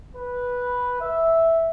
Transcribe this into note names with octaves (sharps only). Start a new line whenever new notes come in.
B4
E5